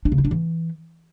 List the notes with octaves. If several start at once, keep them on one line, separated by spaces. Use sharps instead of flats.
D4
C#3
E4
D4
E3